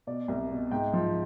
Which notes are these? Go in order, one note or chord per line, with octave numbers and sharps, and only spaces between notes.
B2 D5
C2
B2
G#2 G5
F3